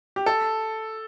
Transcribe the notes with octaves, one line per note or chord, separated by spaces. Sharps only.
G4
A4